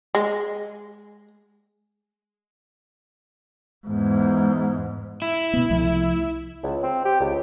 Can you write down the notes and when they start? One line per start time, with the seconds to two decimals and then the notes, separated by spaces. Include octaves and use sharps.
0.15 G#3
3.87 E2 G#2
5.22 E4
5.54 B2 B3
5.70 C2 F3 A3
6.63 C#2
6.83 C4
7.05 G4
7.20 C#2